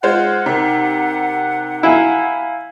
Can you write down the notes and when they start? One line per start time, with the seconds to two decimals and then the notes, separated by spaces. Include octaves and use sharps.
0.03 G#3 F4 C5 F#5
0.46 C3 D#4 A#4
1.83 E4 F5 G#5 A#5